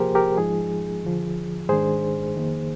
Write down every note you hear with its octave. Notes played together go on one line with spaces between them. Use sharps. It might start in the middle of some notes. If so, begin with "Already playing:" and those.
Already playing: C3 F3 A#3 G4 G#4 A#4 C5
G4 A#4
G#2 F3 G#3 D#4 G#4
D#2 D3 F3
G#2 D#3 G#3 D4 G#4 C5
F2 D#3 A#3